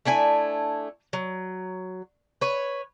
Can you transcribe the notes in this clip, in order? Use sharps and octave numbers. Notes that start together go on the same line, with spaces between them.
A3 D4 E4 G#5
F#3
B4 C#5